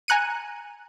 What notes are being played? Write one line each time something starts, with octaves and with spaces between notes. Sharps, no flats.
G#5 A#5 F#6 C#7 D#7